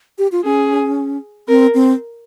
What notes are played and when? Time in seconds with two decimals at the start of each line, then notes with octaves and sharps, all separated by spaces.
0.18 G4
0.32 F4
0.44 C#4 G#4
1.48 C4 A#4
1.74 C4